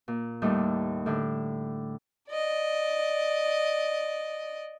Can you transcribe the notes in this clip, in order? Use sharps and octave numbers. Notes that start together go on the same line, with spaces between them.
A#2
D#2 A2 G3 A3
A2 D3
D5 D#5